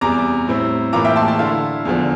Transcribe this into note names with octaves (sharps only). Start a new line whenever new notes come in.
E2 C3 G3 A#5 D6
A2 G3 C4 E4
A2 E3 A#3 F4 A#5 D6
E5 G5
A5 C6
A5 C6
D3 A3 E4 F5 A5
E2 D3 F3